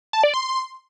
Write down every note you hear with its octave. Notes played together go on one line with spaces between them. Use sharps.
A5
D5
C6